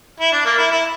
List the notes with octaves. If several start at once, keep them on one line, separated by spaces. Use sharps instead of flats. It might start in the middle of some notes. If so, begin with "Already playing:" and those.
E4
D4
A#3
E4
E4